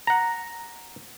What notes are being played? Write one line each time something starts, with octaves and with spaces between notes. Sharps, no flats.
F#5 A#5